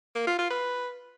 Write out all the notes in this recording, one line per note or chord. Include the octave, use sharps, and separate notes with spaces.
A#3
F4
F4
B4